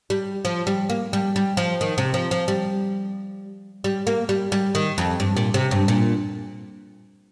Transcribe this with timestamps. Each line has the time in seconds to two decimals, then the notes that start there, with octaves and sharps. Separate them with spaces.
0.10 G3
0.45 F3
0.67 G3
0.90 A#3
1.13 G3
1.36 G3
1.57 F3
1.81 D#3
1.98 C3
2.14 F3
2.31 F3
2.48 G3
3.84 G3
4.07 A#3
4.29 G3
4.52 G3
4.75 D#3
4.98 F2
5.20 G2
5.37 A#2
5.54 C3
5.71 G2
5.88 A#2